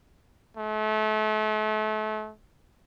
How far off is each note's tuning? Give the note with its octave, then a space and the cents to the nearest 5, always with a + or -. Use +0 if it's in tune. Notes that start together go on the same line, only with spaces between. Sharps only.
A3 -35